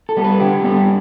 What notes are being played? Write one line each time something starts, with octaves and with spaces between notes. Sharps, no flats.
A4
G3 B3
B4
D3 G4
G3 B3